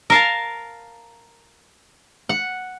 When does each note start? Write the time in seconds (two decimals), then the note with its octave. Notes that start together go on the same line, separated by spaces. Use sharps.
0.10 A#4 F5 A5
2.29 F#5